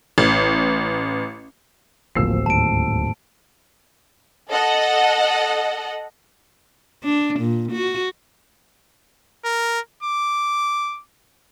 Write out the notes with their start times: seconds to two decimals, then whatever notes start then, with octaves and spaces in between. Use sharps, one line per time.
0.18 A1
2.15 D1 G#1 F3 A#3 E6 C7
2.46 D#2 G#2 A5 D7
4.50 A4 D#5 F#5
7.03 D4
7.40 A#2
7.72 F#4
9.45 A#4
10.03 D6